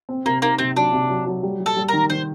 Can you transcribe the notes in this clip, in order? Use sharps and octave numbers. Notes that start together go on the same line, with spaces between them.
C4
C3 A#3
A#3 D#4
C3 C4
F#3 D4
C3
F#3
F#3
G3
G3
A4
G3
D#3 A#4
D#3 C5